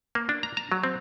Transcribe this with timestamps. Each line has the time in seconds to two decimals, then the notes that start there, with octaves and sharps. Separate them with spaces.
0.15 A#3
0.29 D4
0.43 A#5
0.57 A#5
0.72 F#3
0.84 C4